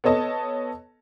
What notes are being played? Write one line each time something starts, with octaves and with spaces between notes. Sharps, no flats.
B3 A4 C#5 D#5 A5